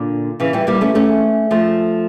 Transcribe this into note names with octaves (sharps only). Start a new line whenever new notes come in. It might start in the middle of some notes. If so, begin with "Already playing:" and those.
Already playing: A#2 D3
C#3 E3
E3 G3
G3 A#3
A3 C#4
A3 C#4
F3 A3